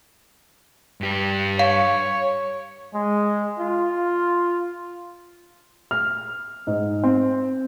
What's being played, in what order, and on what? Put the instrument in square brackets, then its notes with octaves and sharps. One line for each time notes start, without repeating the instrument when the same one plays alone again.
[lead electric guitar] G2 G4
[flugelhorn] C#5 [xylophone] F5
[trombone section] G#3
F4
[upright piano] F6
G#2
C4